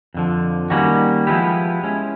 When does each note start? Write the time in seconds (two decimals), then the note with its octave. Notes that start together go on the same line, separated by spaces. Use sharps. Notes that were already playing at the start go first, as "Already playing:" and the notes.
0.14 F2 D3 F3
0.70 D#3 G3 A#3 C#4 F#4
1.27 F3 G#3 B3 E4 G4
1.83 G#3 C#4 E4